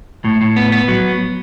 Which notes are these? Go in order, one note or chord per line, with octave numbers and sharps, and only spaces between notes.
A2
A2
B3
B3
F#3